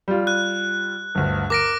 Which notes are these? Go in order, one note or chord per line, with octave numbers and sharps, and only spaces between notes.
G3 F4
F#6
G1 D2
A#4 D6 A#6 D7